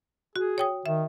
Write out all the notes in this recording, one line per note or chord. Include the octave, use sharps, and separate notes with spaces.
F#4 G#4
C#5 G5 D#6
D#3 E5